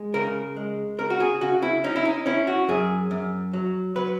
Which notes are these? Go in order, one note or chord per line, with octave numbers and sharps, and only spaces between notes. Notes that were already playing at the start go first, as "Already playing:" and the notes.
Already playing: G#3
C#3 A#4
G#3
C#3 A#4
F#4
G#4
C#3 F#4
E4
C#4 D#4
E4
D#4
C#4 E4
F#4
F#2 G#4
F#2
F#3
F#3 B4